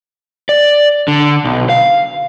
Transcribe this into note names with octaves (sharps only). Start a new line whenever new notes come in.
D5
D3
B1
F5